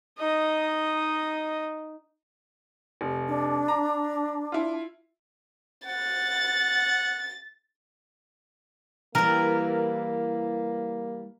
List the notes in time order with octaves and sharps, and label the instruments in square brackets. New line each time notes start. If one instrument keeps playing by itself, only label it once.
[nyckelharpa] D#4 D#5
[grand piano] F1
[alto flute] D4
[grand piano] A#5
E4 F4
[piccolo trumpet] F#5 [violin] A6
[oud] E3 G3 [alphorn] A#3 [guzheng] A#4